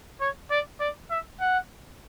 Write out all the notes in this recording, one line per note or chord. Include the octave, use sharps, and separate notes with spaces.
C#5
D5
D5
E5
F#5